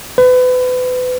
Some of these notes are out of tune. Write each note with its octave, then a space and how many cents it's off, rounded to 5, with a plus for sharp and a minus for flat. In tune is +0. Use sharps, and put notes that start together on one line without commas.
B4 +30